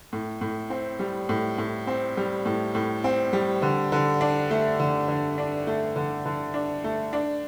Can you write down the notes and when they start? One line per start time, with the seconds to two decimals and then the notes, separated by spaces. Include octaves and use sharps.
0.13 A2
0.41 A2
0.70 C4
0.99 G3
1.29 A2
1.58 A2
1.87 C4
2.17 G3
2.46 A2
2.75 A2
3.04 C4
3.33 G3
3.62 D3
3.92 D3
4.21 D4
4.51 A3
4.80 D3
5.08 D3
5.38 D4
5.67 A3
5.96 D3
6.26 D3
6.54 D4
6.84 A3
7.13 D4